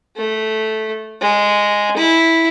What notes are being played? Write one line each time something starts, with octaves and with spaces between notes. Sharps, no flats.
A3
G#3
E4